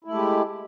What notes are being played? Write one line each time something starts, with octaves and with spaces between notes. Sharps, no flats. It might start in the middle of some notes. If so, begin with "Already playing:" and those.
G#3 A3 E4 G4